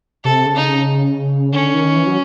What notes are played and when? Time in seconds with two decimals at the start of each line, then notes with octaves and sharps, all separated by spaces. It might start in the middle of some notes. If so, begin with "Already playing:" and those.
0.24 C3 A4
0.46 C#3
0.56 D#4
0.67 C#3
1.53 D3 C#4
1.74 D#3
1.96 E3
2.07 F#3